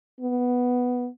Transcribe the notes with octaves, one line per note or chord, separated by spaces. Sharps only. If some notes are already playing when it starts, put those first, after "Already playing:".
B3